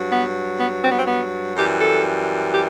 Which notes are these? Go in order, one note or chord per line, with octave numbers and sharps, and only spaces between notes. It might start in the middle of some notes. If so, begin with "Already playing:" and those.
Already playing: G2 F#3
B3
B3
C4
B3
C4
B3
F#2 E3 G3 G4
A4
G4